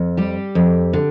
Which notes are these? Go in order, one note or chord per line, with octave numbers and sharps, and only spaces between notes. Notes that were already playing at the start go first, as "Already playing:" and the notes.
Already playing: F2
G3 G4
F2
D3